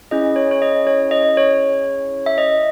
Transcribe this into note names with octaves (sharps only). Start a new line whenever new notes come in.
C#4 E4 G#4 D#5
C#5
C#5
D#5
C#5
D#5
C#5
E5
D#5